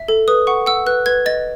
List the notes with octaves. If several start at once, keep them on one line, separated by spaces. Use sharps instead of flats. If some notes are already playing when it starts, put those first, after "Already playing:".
Already playing: E5
A4
B4 D#6
F#5 C#6
F#5 E6
B4 F#6
B4 G#6
D#5 A6